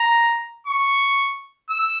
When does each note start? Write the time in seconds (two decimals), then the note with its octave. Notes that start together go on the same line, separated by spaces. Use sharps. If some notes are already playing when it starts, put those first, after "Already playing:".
Already playing: A#5
0.67 C#6
1.70 E6